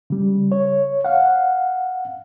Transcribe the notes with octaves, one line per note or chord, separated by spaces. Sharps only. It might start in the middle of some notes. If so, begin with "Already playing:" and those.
C#3 G3
C#5
F5 F#5